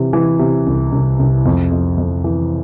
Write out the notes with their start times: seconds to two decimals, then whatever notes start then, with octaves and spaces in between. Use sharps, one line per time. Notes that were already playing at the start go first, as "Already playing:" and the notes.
Already playing: C3 E3
0.13 E3
0.39 C3
0.67 C2
0.92 C2
1.19 C2
1.45 F2
1.72 F2
1.98 F2
2.24 E3